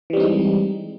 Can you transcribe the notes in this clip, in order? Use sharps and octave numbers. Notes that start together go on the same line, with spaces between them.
E3 G3 G#3 C4 D#4